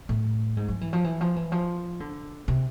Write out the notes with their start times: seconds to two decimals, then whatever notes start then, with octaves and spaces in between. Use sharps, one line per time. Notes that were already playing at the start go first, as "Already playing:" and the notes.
0.09 A2
0.57 G#2
0.68 F3
0.81 E3
0.93 F3
1.04 E3
1.21 F3
1.36 E3
1.52 F3
2.00 D3
2.48 C3